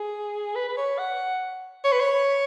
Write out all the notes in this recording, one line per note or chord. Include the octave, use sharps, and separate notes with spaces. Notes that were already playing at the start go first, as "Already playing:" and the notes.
Already playing: G#4
B4
B4
C#5
F#5
C#5
B4
C#5